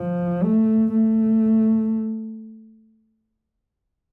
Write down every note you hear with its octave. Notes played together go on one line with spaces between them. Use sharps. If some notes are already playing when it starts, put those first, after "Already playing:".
Already playing: F3
A3
A3